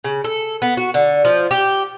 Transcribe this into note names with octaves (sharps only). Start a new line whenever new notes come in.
C#3
A4
B3
F#4
D3
F3
G4